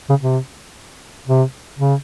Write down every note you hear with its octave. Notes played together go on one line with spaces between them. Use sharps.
C#3
C3
C3
C#3